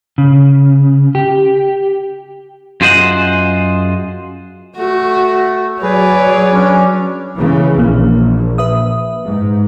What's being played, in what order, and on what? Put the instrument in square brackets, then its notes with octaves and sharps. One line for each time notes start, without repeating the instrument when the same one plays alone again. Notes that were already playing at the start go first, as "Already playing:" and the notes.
[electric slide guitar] C#3
G4
[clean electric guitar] F#2 F4 G#4 C5 D#5 F#5
[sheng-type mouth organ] A3 [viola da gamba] F#4
[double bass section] F#3 [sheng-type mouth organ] G#4 B4 [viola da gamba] C#5 D5
[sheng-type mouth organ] C#4 D4
[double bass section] C#3 E3
[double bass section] A#1 [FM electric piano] A#2 A#3
[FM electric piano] B4 E5 D#6
[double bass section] G#2